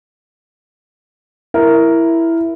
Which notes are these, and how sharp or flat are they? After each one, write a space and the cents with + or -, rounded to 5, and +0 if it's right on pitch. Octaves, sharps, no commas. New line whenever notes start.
E4 +5 A#4 +0